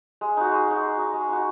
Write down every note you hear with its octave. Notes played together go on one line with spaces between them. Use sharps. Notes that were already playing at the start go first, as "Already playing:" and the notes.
G#3
D#4 F#4
G#3
D#4 F#4
G#3
D#4 F#4
G#3
D#4 F#4